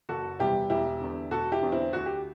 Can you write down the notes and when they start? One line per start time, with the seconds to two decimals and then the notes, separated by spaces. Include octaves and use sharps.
0.09 F#1 F#4 A4
0.39 E2 C3 G3 E4 G4
0.70 E1 E4 G4
1.01 E2 D3
1.31 E1 F#4 A4
1.52 E4 G4
1.62 E2 D3
1.72 C4 E4
1.93 D2 F#4
2.06 G4